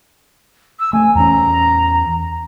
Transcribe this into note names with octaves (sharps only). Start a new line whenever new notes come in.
E6
A3 C4 G#5
E2 C4 C#4 A#5